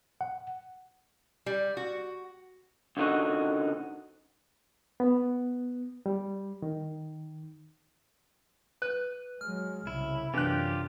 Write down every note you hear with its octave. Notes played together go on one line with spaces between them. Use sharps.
F#5
G3
F#4
C#2 G#2 D3 D#3 D#4 F#4
B3
G3
D#3
B4 F#6
F#3 G#3 F6
C2 C#3 E4
F#2 C3 E3 D4 F4 G4 F#6